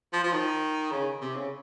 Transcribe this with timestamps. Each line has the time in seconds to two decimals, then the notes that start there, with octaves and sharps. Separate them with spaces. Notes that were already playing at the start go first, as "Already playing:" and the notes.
0.13 F3
0.23 F3
0.32 D#3
0.91 C#3
1.21 C3
1.36 C#3